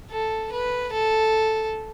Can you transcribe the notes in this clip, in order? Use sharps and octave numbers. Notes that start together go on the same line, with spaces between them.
A4
B4
A4